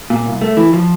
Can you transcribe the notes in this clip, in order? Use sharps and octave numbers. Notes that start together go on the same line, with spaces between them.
A#2
C2
A3
E3
F3